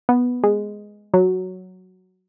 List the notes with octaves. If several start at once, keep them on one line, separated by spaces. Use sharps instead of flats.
B3
G#3
F#3